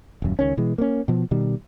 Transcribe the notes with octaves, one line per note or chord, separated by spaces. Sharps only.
D#1 F#2
C#2 D#3 C#4
B2 E3 G#3
A#3 B3 C#4
B2 F3
B2 D#3 G3